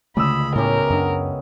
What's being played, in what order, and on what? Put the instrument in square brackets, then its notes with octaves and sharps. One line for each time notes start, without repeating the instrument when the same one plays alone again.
[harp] C#2 D#6 E6 [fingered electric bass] D3 A3 [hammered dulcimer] D5 [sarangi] B5
[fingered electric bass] A2 [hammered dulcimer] E3 C#4 G4 [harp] B3 [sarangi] A#4
[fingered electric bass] F#2 D4 [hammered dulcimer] D#5 F#5